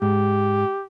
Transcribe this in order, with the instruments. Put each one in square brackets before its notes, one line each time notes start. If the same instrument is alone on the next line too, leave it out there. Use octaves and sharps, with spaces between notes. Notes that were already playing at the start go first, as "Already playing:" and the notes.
[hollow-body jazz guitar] G#2 [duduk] G4